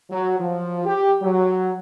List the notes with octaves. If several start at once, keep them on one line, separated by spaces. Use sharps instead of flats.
F#3
F3
G4
F#3